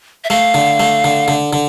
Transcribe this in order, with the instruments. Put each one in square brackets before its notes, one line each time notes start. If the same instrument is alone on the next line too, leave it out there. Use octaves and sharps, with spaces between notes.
[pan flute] E5
[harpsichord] A3 [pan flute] F5
[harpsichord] D3
A3
D3
D3
D3